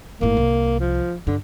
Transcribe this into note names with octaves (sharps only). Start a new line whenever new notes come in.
G1 A2 A#3
C2
F3
G2 D3